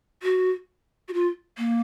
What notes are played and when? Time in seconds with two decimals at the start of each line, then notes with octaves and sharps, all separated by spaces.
0.23 F#4
1.08 F#4
1.14 F4
1.58 A#3